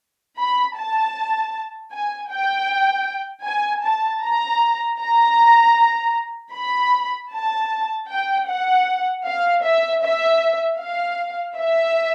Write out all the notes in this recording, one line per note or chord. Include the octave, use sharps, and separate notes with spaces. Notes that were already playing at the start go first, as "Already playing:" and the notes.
B5
A5
G#5
G5
G#5
A5
A#5
A#5
B5
A5
G5
F#5
F5
E5
E5
F5
E5